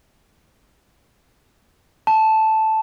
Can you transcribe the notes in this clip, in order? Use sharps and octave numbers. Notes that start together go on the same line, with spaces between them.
A5